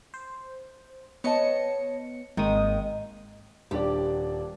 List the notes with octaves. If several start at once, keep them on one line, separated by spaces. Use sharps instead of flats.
C5
B3 C#5 D#5 A5 C#7
G#1 D#3 G#3 A#3 D#6
D#1 D4 G4 D5